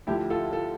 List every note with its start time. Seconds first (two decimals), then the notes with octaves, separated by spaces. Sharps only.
0.07 D2 D3 F3 E4 G4
0.30 F4 A4
0.52 F4 A4